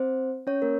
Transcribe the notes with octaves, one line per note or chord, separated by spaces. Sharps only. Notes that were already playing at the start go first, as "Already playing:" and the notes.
Already playing: C4 C5
C#4 C#5
A#3 A#4